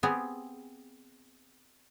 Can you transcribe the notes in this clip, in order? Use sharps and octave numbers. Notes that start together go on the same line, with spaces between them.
B3 C4 G4 G#4